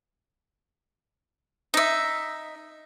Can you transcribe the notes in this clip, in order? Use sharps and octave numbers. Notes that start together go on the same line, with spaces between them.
D#4 E5